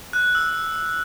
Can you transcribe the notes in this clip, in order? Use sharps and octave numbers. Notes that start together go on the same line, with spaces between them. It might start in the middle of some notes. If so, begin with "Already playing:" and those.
F#6
E6